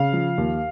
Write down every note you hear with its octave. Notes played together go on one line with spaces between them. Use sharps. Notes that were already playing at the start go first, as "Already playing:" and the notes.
Already playing: C#3 F5
F3
D#2